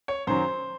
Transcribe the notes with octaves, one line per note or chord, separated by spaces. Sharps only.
C#5
F#2 D#3 F#3 C5